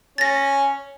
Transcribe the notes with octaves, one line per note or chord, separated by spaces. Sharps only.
C#4 A6 A#6